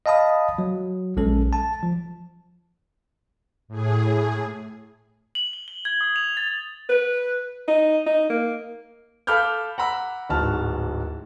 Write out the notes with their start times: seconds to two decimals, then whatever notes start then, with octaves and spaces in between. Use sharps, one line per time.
0.06 D#5 F5 A5 B5 D#6
0.58 F#3
1.17 A#1 G#3 C#4 A4
1.53 A5
1.83 F3
3.68 A2 G#4
5.35 F#7
5.53 G7
5.68 G7
5.85 G#6
6.01 D#6
6.16 F7
6.37 A6
6.89 B4
7.68 D#4
8.06 D#4
8.30 A#3
9.27 A4 F5 B5 D6 F6 G6
9.78 F#5 A#5 B5 E6
10.30 D1 G#2 F#4 A5 F6